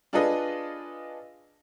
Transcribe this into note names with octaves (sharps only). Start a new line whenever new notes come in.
D4 F4 G#4 A4 B4 D#5